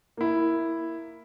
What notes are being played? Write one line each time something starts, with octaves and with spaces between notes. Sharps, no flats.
A#3 E4